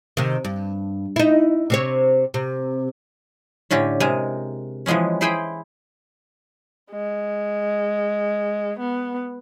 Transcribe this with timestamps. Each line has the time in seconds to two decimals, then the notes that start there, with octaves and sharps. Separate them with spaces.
0.17 C3 D#3
0.44 G2
1.16 D#4 E4
1.70 C3 C4 C#5
2.34 C3
3.71 A2 D3 C#4 G4
4.00 C3 G#3 A#4 G#5
4.86 E3 F3 G#3 B3 C#4
5.21 E4 G#4 C5 G5 G#5 B5
6.92 G#3
8.79 B3